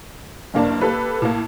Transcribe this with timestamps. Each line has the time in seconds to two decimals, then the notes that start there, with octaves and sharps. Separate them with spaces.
0.54 F#1 G2 A#3 D4 A5
0.81 A#3 G4 A4 B4
1.22 A2 A#3